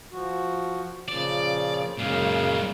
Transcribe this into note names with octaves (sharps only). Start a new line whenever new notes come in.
F3 F#4
A#2 C#3 F3 D5
F#2 A#2 C#3 G#3 F5